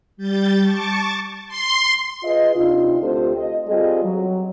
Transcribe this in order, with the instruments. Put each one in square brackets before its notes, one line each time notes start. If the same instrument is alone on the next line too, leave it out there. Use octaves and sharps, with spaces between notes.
[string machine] G3 G6 A6
A5 C#6 D6 A6
C6
[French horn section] F4 G#4 B4 D#5
C3 D4 D#4 F4
D2 C4 F4 G4 A4 C5
D#5
G3 C4 F4 G#4 A4 D#5
F#3